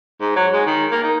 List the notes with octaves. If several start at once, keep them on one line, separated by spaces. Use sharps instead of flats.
G#2
F#3
G#3
D#3
A#3
D#4